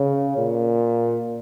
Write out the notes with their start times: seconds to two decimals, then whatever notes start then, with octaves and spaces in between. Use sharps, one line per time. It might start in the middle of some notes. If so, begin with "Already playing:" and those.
Already playing: C#3
0.38 A#2